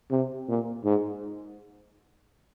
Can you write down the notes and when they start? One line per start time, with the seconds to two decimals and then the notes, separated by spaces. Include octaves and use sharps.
0.11 C3
0.48 A#2
0.84 G#2